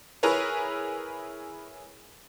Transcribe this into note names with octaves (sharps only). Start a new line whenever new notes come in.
E4 G#4 A#4 B4 C#5